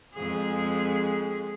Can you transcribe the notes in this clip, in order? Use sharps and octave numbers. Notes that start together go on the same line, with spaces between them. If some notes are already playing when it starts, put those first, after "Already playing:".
F2 G#3 G#4